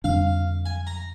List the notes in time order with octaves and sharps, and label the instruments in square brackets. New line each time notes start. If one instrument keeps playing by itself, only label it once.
[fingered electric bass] F2 D3 G3 D4 [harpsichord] F5
[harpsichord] G#5
A#5